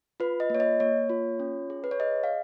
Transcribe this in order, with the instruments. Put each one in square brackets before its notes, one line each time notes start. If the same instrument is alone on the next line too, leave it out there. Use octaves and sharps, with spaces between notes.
[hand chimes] F4 B4
D#5
A#3 C#5
D#5
A#3 C#5
F4
C#4
G#4
B4
C#5
G#4 D#5
F5